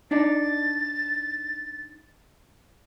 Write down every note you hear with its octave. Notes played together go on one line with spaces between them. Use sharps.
D4 D#4 D5 A6